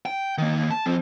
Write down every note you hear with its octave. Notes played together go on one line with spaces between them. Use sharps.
G5
D#3 A#3
A5
F3 C4